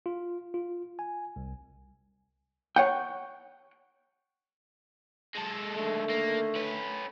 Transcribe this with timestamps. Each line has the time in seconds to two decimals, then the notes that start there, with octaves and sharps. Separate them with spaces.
0.06 F4
0.54 F4
0.99 G#5
1.36 C2
2.76 C#5 F#5 G5
5.35 G#3 A4
5.75 D3 D#3 A3
6.10 A#3
6.56 C#4 B4